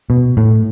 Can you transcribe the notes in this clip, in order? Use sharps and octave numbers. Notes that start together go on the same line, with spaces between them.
B2
A2